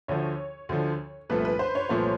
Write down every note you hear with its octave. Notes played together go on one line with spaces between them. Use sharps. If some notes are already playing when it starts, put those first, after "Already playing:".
D2 D3 F3 C#5
D2 D3 F3
C2 A#2 F3 A3 B4
B4
C5
C#5
C2 A#2 F3 A3 C5